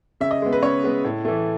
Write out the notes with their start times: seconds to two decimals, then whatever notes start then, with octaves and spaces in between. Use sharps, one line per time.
0.20 C#3 E5
0.31 D#5
0.42 G#3 B3
0.53 B4
0.62 C#3 C#5
0.84 G#3 B3
1.04 A2
1.25 E3 A3